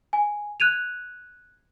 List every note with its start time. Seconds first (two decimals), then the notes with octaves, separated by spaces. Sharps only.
0.13 G#5
0.60 F#6 G#6 D#7 F7